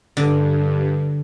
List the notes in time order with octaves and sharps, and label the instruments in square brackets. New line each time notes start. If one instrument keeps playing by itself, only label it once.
[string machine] G2 [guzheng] D3